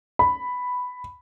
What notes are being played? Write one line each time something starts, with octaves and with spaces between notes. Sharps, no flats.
B5